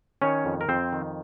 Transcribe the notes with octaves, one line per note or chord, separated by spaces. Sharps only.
D#3 C#4 C#5
F2
A#4
F2 C4 C5
D#3